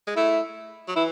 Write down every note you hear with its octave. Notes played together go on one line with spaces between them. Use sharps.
G#3
A3 E4
F#3
E3 E4